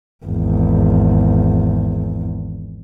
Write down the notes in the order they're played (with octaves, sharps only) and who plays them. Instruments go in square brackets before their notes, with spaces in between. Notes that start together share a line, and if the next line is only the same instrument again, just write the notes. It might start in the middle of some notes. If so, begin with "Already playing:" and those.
[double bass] G#1 E2